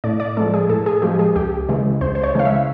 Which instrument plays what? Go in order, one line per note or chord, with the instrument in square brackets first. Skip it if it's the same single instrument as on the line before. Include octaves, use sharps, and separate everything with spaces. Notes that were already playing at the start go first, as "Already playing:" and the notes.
[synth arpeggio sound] A2 D5
D5
F3 G#3 A4
G#4
A2 A4
G#4
F3 G#3 G4
G#4
C#2 G4
C#3 E3 G#3
C#2 C5
C5
C#5
C#3 E3 G#3 F5
E5